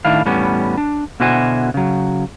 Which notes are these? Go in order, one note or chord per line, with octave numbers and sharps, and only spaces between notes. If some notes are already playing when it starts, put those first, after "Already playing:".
A2 D#3 D4 E4 F5
E2 A2 G3 B3 C#4
D4
B2 D3 E4 F#4 C5 G#5
C#3 F#3